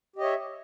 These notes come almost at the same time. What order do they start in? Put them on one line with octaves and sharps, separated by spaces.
G4 D#5 C#5 E5